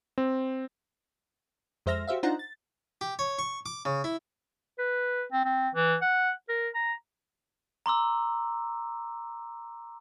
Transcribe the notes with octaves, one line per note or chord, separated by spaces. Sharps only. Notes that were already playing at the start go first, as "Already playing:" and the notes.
C4
F2 G#3 C5 E5 F6 A#6
F#4 G4 C5 E5 F5
D4 D#4 F4 C5 F#5 A#5
A6
G4
C#5
C#6
D6
C#3
E4
B4
C4
C4
E3
F#5
A#4
A#5
A#5 C6 D6 E6